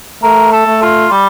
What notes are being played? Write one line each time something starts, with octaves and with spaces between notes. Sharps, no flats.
A3 A#4
A4
A3
F4
G3